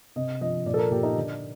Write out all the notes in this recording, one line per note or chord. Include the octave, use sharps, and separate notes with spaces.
C3 D#5
F3 D#5
A#2 D5
A4
A#4
A#2 G4
D#4
D3 D4